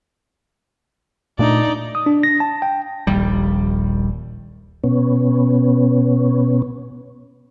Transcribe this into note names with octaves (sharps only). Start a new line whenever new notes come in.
A#2 A3 D4 D#4 D5
D#6
D4
A#6
A5
G5
D#1 A#1 D#2 G3
B2 B3 C#4